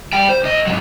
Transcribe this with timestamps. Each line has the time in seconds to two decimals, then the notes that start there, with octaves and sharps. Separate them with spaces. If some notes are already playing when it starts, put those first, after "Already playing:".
0.13 G3 G5
0.29 C5
0.43 B1 D#5
0.67 G#2 F#3